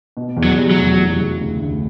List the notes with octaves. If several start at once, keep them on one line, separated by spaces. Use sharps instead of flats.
B2
E2
F#3
G3
F#3
F1
E3
C#3
D2
D2